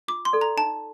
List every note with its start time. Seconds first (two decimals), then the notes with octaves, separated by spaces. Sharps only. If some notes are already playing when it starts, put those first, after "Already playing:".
0.08 F4 D6
0.25 C6
0.33 A4 D5
0.41 A#5
0.57 D#4 A5